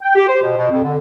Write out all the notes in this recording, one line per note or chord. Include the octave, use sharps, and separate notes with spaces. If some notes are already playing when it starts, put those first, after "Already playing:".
G5
G4
C5
B2
B2
F2
D3